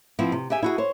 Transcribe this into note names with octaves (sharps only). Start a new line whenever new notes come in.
F3 B3 C4 E4
C3
G4 G#4 E5 G#5
E4 F#4 G#4
C5 C#5